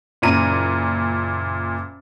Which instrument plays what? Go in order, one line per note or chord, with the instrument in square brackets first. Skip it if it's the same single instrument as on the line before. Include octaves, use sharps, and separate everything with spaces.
[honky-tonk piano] F#1 A#2 A#5 D#7